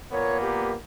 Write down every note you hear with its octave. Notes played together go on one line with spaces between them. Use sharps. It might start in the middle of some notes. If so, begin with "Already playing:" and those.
A#2 A#3 B3 C#5
G4